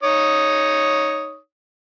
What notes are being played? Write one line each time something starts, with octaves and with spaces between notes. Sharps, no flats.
D#4 C#5 D#6